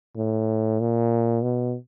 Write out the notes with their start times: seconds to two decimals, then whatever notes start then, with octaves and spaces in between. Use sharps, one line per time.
0.17 A2
0.80 A#2
1.42 B2